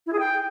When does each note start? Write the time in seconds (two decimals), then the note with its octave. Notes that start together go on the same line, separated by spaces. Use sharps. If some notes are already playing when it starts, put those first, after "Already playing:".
0.06 E4
0.13 G#4
0.19 G5